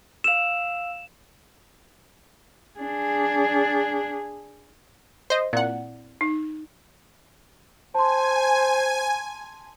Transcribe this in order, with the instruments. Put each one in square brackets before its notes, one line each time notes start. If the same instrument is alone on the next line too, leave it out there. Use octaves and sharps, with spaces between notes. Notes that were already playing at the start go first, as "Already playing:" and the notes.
[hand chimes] F5 E6 [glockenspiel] E7 F7
[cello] D4 G#4
[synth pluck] C5 D#5
[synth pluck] A#2 F#5 [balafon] C4 E4 D5
[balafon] D#4
[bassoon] C5 [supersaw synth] G#5 [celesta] A5 C6